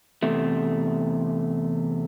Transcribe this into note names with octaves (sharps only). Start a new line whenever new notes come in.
E2 C3 A3